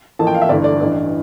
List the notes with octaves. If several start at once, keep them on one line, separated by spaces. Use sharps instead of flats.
A1 A2 F3 A#3 A5
G5
F5
E5
G1 G2 E3 A3 D5
D5
A1 G2 E3